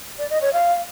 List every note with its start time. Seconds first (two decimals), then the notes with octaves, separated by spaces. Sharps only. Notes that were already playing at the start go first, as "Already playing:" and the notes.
0.18 D5
0.30 D#5
0.42 C#5
0.53 F5